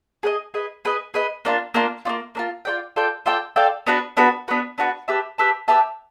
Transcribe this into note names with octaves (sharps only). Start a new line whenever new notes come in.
G#4 B4 D#5
G#4 B4 D#5
G#4 B4 D#5
G#4 B4 D#5
A#3 D4 F4
A#3 D4 F4
A#3 D4 F4
A#3 D4 F4
F4 A4 D5 G5
F4 A4 D5 G5
F4 A4 D5 G5
F4 A4 D5 G5
B3 D4 F#4 B4
B3 D4 F#4 B4
B3 D4 F#4 B4
B3 D4 F#4 B4
G4 B4 E5 A5
G4 B4 E5 A5
G4 B4 E5 A5